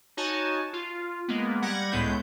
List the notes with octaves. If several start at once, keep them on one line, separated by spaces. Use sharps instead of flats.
D#4 F#4 C#5 G#5 A5
F4
G#3 A#3 B3
G3 F#5 G#6 A#6
C#2 A2 G#3 B3 E4 G6